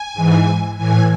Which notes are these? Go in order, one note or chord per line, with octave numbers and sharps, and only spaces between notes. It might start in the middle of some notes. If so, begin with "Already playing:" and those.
Already playing: G#5
G#2 E3
A2 E3 G#5